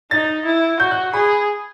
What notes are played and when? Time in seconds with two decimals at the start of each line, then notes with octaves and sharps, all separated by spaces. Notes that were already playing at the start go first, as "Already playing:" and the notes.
0.11 D#4 A6
0.45 E4
0.80 F#4 G6
0.91 F#6
1.13 G#4 B5